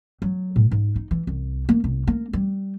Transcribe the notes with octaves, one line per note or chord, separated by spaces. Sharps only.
F#3
A2
G#2
D#4
E3
C2
A#3
C2
A#3
G3